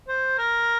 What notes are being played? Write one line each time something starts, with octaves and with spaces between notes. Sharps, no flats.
C5
A#4